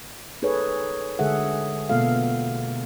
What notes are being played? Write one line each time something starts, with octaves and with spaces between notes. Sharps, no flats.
D#4 G#4 A4 B4 C#5
D3 G#3 G#4 A4 E5 F#5
B2 A#3 B3 F4 A4 F5